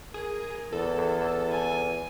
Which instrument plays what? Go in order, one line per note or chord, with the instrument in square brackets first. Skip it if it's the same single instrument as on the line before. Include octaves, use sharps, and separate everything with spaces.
[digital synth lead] G#4 [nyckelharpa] A#4
[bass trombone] E2 [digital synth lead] A4
[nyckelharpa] G#5